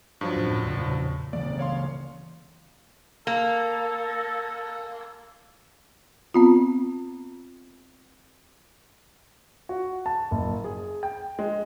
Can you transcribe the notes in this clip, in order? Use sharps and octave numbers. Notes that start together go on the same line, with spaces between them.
G2 F3 F#3
F#2 A2 C#4
E2 A#2 C#3
C#3 E3 A#3 D5
C#5 F5 C6
A#3 A4
B3 C4 F4
F#4
A5
F#1
G#4
G5
G#3